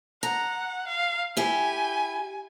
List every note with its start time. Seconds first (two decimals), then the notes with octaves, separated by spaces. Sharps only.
0.23 F#5 A#5
0.88 F5
1.37 E4 G4 G#5